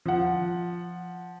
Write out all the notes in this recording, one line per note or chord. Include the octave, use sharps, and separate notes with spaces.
F3 F#5